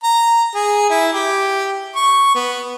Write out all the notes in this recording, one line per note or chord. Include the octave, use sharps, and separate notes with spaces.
A#5
G#4
E4
G4
C#6
B3